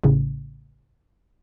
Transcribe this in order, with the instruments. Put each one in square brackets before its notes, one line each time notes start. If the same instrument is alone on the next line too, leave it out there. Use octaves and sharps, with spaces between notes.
[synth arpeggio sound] A1 A2 C#3